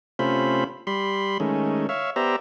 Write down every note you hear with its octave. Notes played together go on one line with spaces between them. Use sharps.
C3 A3 C#4 F4 C5 B5
G3 B5 C6
D#3 G#3 A3 C#4
C#5 E5 F5
B3 G4 C5 D5 E5 A#5